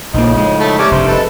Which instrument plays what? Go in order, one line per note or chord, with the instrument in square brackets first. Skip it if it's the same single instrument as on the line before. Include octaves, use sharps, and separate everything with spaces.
[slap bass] A#1 A#3 [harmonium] A2 C#3 F3 [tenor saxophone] D#4
[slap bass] G#3
[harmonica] A3 A5
[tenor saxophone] C3 [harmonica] C#4 D5
[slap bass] F1 G2 [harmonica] C5
[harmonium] G#3 B4 A5 [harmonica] A4